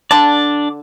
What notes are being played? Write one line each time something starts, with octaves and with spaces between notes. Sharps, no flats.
D3 D4 D5 A5